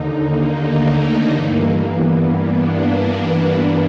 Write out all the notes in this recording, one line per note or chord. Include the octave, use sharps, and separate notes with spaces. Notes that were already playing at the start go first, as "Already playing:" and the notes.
Already playing: D#2 D3 D#4
A#3
A3
G2 E3 A#3
B3
D4